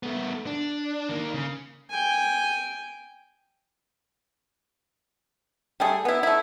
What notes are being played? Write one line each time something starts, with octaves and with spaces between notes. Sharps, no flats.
A3 B3
D4
D#3 A#3
C#3
G5 G#5
G3 A3 G#4
B3 E4
A3 E4